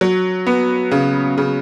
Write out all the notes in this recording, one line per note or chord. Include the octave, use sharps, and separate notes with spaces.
F#3
B3
C#3
C#3